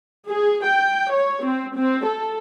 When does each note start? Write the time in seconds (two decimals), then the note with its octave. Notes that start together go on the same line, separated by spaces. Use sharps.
0.28 G#4
0.64 G5
1.12 C#5
1.43 C4
1.75 C4
2.06 A4